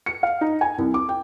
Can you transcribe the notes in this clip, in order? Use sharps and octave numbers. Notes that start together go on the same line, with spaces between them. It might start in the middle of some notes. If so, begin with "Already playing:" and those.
C#7
F5
D#4
G#5
C2
D6
G5